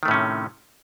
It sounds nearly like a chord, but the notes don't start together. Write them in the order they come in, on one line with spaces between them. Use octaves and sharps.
D#3 A3 A2 C#4 C3